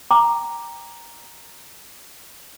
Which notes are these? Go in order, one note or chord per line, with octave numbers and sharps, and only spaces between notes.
G5 A#5 D6